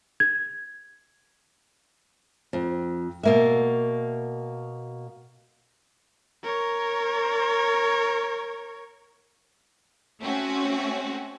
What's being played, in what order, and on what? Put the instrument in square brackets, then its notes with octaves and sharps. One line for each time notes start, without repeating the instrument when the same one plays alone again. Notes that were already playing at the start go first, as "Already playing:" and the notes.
[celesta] G#6
[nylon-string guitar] F2
B2 A#3 E5
[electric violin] A#4 C#5
[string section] A3 C4 C#4 F#4